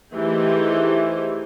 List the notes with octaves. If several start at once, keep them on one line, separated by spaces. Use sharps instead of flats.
E3 A3 D#4 G4 G#4 C5